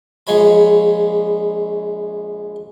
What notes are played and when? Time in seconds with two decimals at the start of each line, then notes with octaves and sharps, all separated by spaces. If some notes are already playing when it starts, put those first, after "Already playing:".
0.27 A#1 G#3 C#5 B5